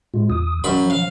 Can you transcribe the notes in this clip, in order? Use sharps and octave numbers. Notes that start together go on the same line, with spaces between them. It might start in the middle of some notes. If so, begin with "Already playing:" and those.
A2 G#3 F4
E2 D#6
F#2 B5
F3
F5